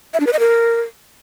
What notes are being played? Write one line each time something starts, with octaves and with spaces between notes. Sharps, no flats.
E5
D4
B4
D#5
A#4